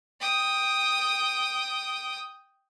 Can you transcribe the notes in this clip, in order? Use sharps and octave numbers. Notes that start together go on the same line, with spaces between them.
G5 D#6